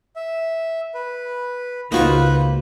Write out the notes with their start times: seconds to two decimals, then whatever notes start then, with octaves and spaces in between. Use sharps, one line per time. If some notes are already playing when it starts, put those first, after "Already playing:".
0.16 E5
0.94 B4
1.92 C#2 A#3 D#4 F4 F#4 B4 C5 F#6